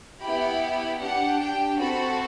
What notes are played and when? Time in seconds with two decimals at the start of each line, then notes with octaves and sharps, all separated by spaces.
0.21 B3 E4 G4 B5
1.00 D4 G4 F#5
1.41 G5
1.80 C4 F#4 A4 B5